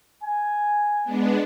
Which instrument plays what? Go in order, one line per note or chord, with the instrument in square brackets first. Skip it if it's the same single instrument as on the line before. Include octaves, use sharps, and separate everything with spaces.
[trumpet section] G#5
[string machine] G#3 B3 D4